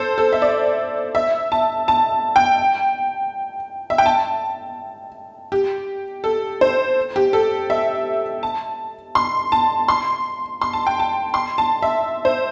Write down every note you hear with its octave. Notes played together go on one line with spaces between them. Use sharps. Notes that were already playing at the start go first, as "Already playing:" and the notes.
Already playing: A4 C5
A4
E5
D5
E5
A5
A5
G5
E5
G5
A5
G4
A4
C5
G4
A4
E5
A5
C6
A5
C6
C6
A5
G5
A5
C6
A5
E5
C5